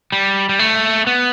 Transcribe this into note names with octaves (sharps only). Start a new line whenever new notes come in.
G3
G3
A3
B3